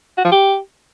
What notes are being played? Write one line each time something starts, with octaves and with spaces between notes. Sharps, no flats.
F#4
F3
G4